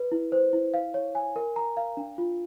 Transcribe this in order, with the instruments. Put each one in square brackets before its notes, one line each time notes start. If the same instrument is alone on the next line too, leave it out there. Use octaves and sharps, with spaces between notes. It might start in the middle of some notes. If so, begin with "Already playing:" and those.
Already playing: [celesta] B4
E4
C5
E4
F5
C#5
G#5
A#4
A#5
F5
D4
F4